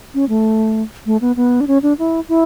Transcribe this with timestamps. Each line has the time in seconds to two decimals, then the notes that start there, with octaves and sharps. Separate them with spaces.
0.14 C#4
0.29 A3
1.06 A3
1.21 B3
1.36 B3
1.61 D4
1.67 C#4
1.83 D4
1.99 E4
2.29 E4